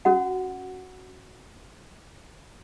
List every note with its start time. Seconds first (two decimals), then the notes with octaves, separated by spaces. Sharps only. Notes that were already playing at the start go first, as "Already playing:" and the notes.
0.05 C#4 F#4 F#5